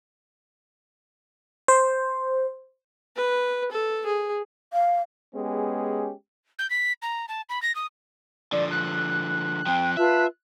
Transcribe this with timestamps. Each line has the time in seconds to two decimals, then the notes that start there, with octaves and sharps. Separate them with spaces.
1.68 C5
3.16 B4
3.71 A4
4.06 G#4
4.73 F5
5.34 G#3 B3 C#4 G4 G#4
6.59 G6
6.70 B6
7.02 A#5
7.28 A5
7.49 B5
7.62 A#6
7.75 D#6
8.52 D3 F3 D5
8.71 F#6
9.66 F3 C4 G5
9.97 F4 B4 E5 A5